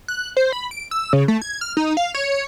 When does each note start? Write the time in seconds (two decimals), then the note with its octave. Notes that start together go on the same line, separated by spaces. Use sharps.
0.08 F#6
0.37 C5
0.52 B5
0.71 D7
0.91 E6
1.13 C#3
1.28 A3
1.42 G#6
1.61 F6
1.77 D#4
1.97 F5
2.14 C#5